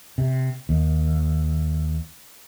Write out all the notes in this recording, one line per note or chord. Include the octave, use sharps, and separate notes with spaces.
C3
D#2